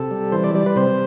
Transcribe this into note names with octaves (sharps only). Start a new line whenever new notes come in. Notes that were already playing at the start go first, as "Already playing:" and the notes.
Already playing: C3 A4
G3
E3 C5
D5
G3 D5
B4
C3 C5